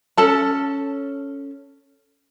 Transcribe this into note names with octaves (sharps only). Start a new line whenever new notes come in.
C#4 A4 A5